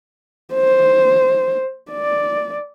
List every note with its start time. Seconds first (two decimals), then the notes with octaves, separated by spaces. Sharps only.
0.54 C5
1.91 D5